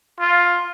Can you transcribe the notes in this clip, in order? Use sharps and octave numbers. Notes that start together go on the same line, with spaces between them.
F4